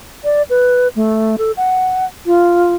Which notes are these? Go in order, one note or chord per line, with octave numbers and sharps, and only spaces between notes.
D5
B4
A3
A4
F#5
F4